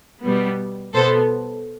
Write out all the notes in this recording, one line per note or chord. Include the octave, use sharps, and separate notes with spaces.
B2 G3 B3
B2 B3 A4 C5